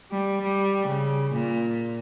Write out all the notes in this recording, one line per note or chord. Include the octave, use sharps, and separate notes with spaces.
G3
G3
C#3
A#2